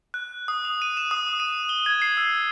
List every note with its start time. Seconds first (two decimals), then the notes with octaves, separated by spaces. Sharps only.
0.14 F#6
0.48 D#6
0.65 F7
0.82 D#7
0.97 E7
1.11 D#6
1.40 D#7
1.69 G7
1.86 G#6
2.02 C7
2.17 E6